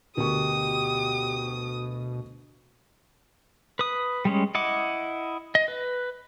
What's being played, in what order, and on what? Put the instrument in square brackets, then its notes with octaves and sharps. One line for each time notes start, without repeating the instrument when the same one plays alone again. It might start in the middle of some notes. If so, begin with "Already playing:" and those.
[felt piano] D2 A#4 C#6 [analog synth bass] B2 [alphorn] G4 [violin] D#6
[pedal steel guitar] B4 D#6
G3 G#3 C#4
E4 D#5 F#5 D6
D#5
B4